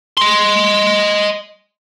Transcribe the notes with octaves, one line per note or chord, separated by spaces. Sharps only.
D#5 C6